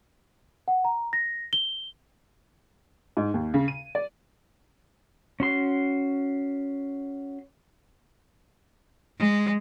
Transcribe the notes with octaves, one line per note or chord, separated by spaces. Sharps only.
F#5
A#5
A#6
G7
G#2
D#2
C#3
D#7
D5
C#4 F#4 C6
G#3